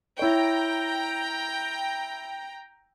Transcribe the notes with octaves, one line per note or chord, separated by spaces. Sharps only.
E4 C#5 G5 A#5